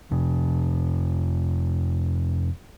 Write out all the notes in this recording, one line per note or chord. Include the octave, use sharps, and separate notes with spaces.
F2 C3